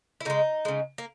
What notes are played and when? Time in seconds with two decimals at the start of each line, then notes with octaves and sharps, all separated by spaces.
0.21 E4
0.25 C#3 G#3 D#4
0.65 C#3 G#3
0.98 A#3